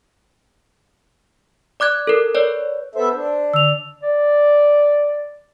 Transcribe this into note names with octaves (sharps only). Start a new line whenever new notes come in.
D5 D6 F#6 G#6
A4 A#4
B4 C#5 D5
B3 A4 C5 E5
D4
D3 E6 F7
D5